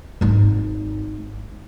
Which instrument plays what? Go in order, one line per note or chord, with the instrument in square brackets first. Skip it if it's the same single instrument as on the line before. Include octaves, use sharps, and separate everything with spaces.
[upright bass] G#1 D#4